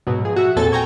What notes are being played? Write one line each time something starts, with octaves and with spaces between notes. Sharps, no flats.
G#2 B2 F#3
F3 G#4
F#4 E5
E2 A#2 C4 A4 G#5 A6
G5 G#5 A#5 C#6 G#6